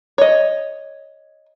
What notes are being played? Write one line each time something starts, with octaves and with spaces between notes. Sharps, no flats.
C#5 D#5